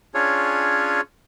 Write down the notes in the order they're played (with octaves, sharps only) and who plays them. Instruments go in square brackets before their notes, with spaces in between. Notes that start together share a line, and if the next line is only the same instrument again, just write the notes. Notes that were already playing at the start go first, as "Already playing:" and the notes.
[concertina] C#4 D4 F4 G#4 C#5